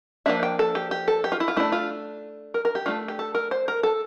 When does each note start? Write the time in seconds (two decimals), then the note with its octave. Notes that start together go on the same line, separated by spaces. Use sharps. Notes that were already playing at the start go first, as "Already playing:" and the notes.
0.26 F3 A#3 D4 E5
0.43 G5
0.59 A4
0.75 G4
0.91 G4
1.08 A4
1.24 G4
1.32 F4
1.40 E4
1.48 F4
1.57 A3 D4 E4
1.72 F4
2.54 A#4
2.65 A#4
2.75 G4
2.86 A3 D4 F4
3.08 G4
3.19 A4
3.35 A#4
3.51 C5
3.68 A#4
3.83 A4